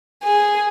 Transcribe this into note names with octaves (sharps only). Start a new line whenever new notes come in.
G#4